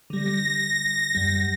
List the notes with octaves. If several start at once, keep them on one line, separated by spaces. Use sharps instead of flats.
D3 G3 A#6
F#2 G3